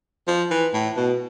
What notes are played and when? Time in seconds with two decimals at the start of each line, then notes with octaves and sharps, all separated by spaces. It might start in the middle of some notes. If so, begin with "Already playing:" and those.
0.27 F3
0.51 E3
0.73 A2
0.96 B2